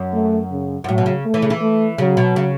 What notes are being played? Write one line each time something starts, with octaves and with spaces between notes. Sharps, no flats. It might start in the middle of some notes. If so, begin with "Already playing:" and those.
Already playing: F#2
A3
C#3
F#2
A2 F#3
B2
C#3
A3
E3
C#3
E3
A3
C#3 F#3
B2
C#3